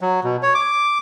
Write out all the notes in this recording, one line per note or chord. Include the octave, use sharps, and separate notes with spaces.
F#3
B2
C#5
D6